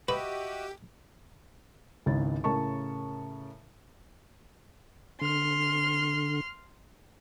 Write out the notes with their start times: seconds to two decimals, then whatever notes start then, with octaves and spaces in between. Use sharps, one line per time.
0.08 F#4 G4 B4 D#5 E5
2.06 G#1 C#2 C#3 E4 C#5 A6
2.44 A2 C#3 A#4 A5 C#6
5.21 D3 C6 F6